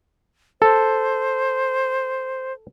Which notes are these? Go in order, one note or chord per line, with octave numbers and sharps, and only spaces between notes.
A4 C5